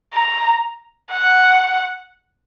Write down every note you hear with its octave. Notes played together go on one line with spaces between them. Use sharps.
A#5
F#5